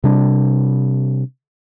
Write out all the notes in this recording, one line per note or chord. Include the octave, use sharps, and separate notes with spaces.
C3 G3 D4